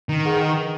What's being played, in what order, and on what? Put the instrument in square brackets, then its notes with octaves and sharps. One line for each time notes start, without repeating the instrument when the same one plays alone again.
[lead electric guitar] D#3
[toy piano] G#4 B4 F#5 C#6